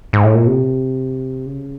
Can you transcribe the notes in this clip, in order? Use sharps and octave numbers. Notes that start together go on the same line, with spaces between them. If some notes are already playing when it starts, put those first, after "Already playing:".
G#2
A2
A#2
C3
C#3